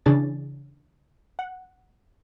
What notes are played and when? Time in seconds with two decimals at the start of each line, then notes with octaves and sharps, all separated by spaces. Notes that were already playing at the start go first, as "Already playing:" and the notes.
0.06 C#3 E3 D4 G#4 C#5 A6
1.39 F#5